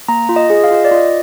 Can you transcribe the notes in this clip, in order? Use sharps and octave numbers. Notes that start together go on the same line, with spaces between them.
A#3 A#5
F4
D#5
G#4
F5
F4 D#5
D5
F4 D#5